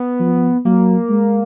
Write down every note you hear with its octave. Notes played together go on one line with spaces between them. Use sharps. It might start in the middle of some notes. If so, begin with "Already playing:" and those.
Already playing: B3
F3
F#3 A#3
G#3